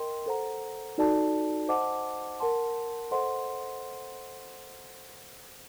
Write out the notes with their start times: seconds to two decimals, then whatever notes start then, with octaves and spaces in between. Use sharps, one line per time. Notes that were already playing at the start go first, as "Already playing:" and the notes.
Already playing: A#4 D#5 G5 C6
0.26 A4 C5 F#5 A#5
0.98 D#4 F#4 A4 D5 A5
1.69 C5 D#5 F#5 A5 D6
2.40 A#4 F#5 A5 C6
3.11 A4 C5 D#5 F#5 C6